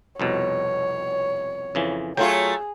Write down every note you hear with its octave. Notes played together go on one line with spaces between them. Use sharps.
C2 F2 B2 C#5
F2 C#3 E3
F#3 A3 F4 G#4 G5